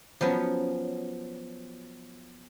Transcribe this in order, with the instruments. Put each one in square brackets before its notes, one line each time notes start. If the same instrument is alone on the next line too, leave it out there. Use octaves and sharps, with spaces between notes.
[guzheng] F3 F#3 B3 C#4